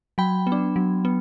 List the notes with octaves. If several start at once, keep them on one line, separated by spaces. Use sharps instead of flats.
F#3 G5 B5
B3
D4
F#3
B3